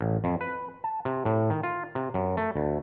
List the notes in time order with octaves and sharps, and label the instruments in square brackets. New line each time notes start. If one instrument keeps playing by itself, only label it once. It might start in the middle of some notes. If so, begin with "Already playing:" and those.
[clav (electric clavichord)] A1
F2
B4
A5
C3
A2
D#3
F4
C3
F#2
A3
D2